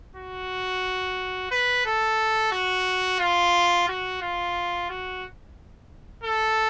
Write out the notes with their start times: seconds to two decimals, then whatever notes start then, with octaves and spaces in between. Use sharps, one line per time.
0.16 F#4
1.51 B4
1.86 A4
2.52 F#4
3.20 F4
3.88 F#4
4.22 F4
4.90 F#4
6.24 A4